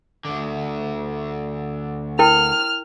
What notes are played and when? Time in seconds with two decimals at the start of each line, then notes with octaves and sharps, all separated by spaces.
0.25 D2 D3
2.19 E4 A#4 G5 F6